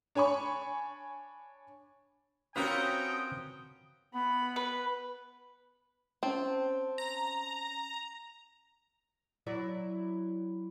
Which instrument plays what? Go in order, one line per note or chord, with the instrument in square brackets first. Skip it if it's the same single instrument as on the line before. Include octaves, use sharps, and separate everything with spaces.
[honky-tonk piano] D4 C#5 G#5 B5 C#6
[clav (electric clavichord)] C4 F4 B4 [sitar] C#4 F#4 A#4 [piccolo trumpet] G5 [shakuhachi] D#6
[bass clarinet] B3 [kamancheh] B5
[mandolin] B4
[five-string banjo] C4 [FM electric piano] C#4 A5
[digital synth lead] A#5
[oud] F#3 E4 D5